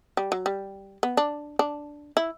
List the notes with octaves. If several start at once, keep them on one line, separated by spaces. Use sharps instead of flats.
G3
F#3
G3
B3
D4
D4
E4